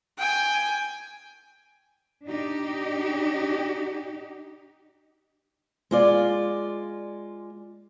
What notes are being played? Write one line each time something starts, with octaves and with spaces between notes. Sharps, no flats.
G5 G#5
D4 D#4 G4
G#3 F4 D5